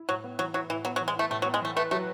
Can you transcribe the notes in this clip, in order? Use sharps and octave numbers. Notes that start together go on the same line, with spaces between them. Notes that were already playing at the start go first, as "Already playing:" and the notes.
Already playing: E4
A2 F#3
B3
E3 F#3
F#3 E4
A2 E3
F#3 B3
F#3
E3
G#3
A3 E4
A2 A3
F#3
B3
G#3
E3 A3
A3 B4
F#3 A3